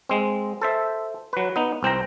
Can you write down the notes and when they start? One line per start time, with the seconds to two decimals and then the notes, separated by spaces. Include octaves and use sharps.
0.09 G#3 C4
0.61 A4 C5 E5
1.33 F#3 B4
1.56 B3 D#4
1.83 C2 C4 G5 A#5